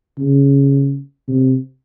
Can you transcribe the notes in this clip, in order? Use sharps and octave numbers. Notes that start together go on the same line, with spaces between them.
C#3
C3